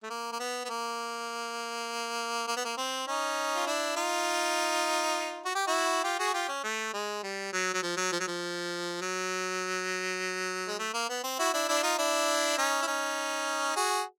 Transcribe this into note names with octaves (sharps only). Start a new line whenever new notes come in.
A3
A#3
A#3
B3
B3
A#3
A#3
B3
A#3
C4
C#4 D#4
F4
D4 E4
D#4 F4
F#4
G4
E4 F#4
F4 G4
F#4 G#4
F4 G4
C#4
A3
G#3
G3
F#3
F#3
F3
F#3
F3
F#3
F3
F#3
G#3
A3
A#3
B3
C4
E4 F#4
D4 E4
D4 E4
D#4 F4
D4 E4
C#4 D#4
E4
C#4 D#4
F#4 G#4